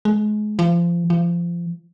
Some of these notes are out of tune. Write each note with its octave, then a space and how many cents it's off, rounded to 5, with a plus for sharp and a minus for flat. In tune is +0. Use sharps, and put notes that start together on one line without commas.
G#3 +30
F3 -25
F3 -25